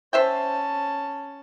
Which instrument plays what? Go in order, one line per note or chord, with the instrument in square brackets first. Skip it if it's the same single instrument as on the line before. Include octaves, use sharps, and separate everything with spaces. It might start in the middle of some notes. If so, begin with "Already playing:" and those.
[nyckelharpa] C#4 A5 [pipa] C5 E5 G5